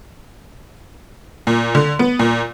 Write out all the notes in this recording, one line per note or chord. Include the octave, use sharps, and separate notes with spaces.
A#2
D3
B3
A#2